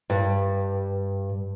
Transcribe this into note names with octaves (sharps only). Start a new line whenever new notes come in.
G2